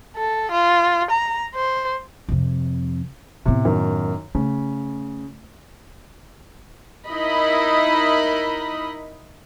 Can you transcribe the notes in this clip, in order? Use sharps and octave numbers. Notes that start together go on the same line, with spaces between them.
A4
F4
A#5
C5
F2 C3
A2 C3 B3
F#2 D#3
C#3 A3
D#4 E4 A#4 D#5 B5